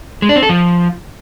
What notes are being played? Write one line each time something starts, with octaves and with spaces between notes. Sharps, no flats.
G#3
D4
C4
A4
F3